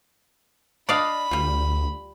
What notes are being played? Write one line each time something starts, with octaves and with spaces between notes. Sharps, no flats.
D4 D5 D#5 F5 B5
D2 G3 F4